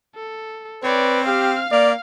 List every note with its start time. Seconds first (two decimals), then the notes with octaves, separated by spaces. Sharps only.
0.15 A4
0.83 C4 B4 C#5 D5
1.27 G4 F5 F6
1.71 A#3 D5